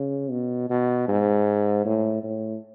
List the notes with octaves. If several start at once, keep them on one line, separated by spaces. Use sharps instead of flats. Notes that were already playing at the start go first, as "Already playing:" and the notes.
Already playing: C#3
B2
B2
G#2
A2
A2